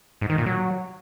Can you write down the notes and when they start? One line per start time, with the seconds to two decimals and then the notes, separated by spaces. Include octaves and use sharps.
0.21 G#2
0.30 D#3
0.38 A#2
0.46 F#3